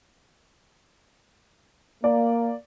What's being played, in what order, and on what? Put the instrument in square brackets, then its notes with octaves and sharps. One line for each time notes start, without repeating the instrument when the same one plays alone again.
[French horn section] A#3 [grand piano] D5